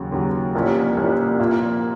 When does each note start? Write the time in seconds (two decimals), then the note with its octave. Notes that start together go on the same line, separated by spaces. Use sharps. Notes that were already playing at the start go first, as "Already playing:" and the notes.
Already playing: D#2 C#3 F#3
0.12 D#2 C#3 F#3
0.55 C2 C3 F3 A#3 C#4
0.97 C2 C3 F3 A#3 C#4
1.39 A#2 F3 A#3 F4